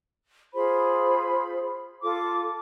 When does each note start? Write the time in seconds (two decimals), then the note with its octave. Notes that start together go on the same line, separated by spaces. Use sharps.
0.54 F4 G#4 C5 B5
2.02 F4 A4 D6